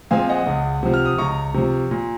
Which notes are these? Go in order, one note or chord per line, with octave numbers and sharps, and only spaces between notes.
A#2 F3 G#3 C4 F5 G#5
D#5 F#5
C#2
C3 F3
F6
D#6
C#2 A#5 C#6
C3 F3
A#2